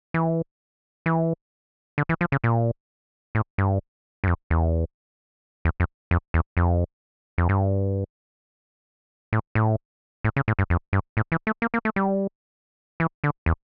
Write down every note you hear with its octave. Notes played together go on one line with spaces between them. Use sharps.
E3
E3
D3
E3
F3
C#3
A#2
A2
G2
G2
F2
E2
E2
F2
F2
E2
F2
F2
G2
A2
A2
A2
C#3
A2
G2
F2
G2
A2
E3
A3
A#3
A#3
A3
G3
E3
D3
E2